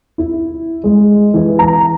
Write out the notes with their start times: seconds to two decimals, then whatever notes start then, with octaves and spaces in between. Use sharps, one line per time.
0.18 E4
0.84 G#3
1.34 E3
1.59 A#5